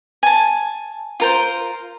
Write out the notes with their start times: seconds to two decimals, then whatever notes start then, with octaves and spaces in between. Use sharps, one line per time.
0.23 G#5 A5
1.20 F4 A#4 C5